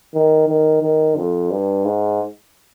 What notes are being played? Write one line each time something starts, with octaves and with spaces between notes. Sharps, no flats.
D#3
D#3
D#3
F2
G2
G#2